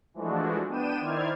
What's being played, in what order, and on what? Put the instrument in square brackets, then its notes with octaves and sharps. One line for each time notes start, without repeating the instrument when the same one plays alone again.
[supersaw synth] E3 F3 G#3 A3 D4 F#4
B3 D4 G5 D#7 E7
D#3 E4 C5 D5 F6 G#6